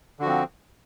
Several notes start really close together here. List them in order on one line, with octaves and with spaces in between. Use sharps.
D3 F#4 F3 C4